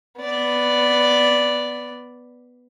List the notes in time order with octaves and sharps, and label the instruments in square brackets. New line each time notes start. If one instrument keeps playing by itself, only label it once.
[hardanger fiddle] B3 D5